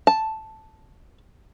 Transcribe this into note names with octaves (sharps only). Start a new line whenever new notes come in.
A5